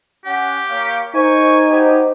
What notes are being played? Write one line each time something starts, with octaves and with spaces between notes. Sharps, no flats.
C#4 G4 F#5
A#3 C#5 F5
D#4 G#4 A#4 C5 G#5 C#6
B3 F#4 G4 C5